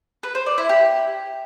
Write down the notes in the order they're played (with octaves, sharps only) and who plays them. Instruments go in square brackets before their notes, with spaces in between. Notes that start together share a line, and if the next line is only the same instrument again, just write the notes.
[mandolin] B4
C5
D5
E4
G4